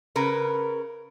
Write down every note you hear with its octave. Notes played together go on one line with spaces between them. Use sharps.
C#3 A#4 B4